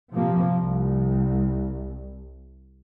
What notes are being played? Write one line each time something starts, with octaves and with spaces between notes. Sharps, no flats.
C3 F3 A#3
C2